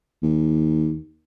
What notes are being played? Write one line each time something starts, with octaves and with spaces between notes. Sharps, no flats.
D#2